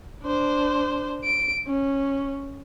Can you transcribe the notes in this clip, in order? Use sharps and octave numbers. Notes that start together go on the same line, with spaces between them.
D4 C5
D7
C#4